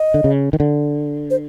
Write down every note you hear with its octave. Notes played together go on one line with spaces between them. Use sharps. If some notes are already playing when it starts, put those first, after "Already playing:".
Already playing: D#5
D3
C#3
D#3
D3
C5